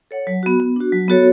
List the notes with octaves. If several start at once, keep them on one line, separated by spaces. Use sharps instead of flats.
A4 C#5 F#5
F#3
B3 F#4
B3
D4 F#4
F#3
B3 F#4 A4 C#5